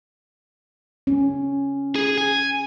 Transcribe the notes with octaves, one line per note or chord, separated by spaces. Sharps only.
C#4
G#4
G#5